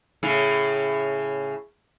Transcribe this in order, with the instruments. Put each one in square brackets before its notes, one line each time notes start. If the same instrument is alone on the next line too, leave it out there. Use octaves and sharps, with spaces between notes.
[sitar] A2 C#3